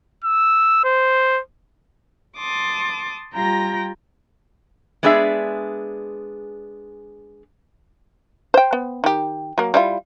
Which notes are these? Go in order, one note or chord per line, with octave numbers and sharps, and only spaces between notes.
E6
C5
A5 C6 D6 D#6
G3 F4 G5 A#5 A#6
G#3 B3 D4 G#4 A4 E5
C5 G5
B3
D#3 G4
F#3 A#3
G3 E4 F4